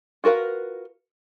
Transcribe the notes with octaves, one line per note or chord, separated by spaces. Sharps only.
F4 F#4 A#4 B4 F5